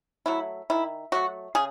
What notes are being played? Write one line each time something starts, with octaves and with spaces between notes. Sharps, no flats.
F#3 A3 E4
D#3 E4
F#3 A3 F#4
C#3 G#4